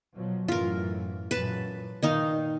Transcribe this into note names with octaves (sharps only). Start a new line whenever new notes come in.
B2 F3 F#3
F#2 A2 E3 F4 A#4
F#2 A#2 E3 B4 A5
A#2 D#3 D#4 F5